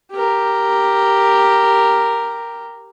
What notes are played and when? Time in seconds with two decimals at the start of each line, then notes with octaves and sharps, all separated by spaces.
0.11 G4 A#4